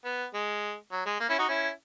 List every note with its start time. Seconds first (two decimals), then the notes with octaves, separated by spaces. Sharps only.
0.05 B3
0.34 G#3
0.92 F#3
1.06 G#3
1.20 A#3
1.29 C#4 E4
1.39 D#4 F#4
1.48 C#4 E4